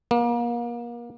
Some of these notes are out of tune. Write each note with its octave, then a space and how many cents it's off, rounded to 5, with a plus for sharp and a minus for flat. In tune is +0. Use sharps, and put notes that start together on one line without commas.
A#3 +35